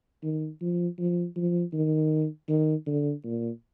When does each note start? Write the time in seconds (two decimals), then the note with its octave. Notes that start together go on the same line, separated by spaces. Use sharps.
0.23 D#3
0.62 F3
0.99 F3
1.36 F3
1.73 D#3
2.49 D#3
2.87 D3
3.24 A#2